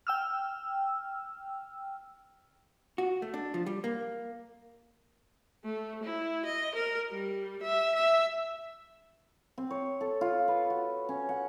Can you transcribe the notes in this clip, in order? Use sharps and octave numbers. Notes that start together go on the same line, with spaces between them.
G5 E6 F6
F#4
A3
D4
F3
G3
A#3
A3
E4
D#5
A#4
G3
E5
E5
C4
C#5
A4
F4
B4
F#4
C#4
F#5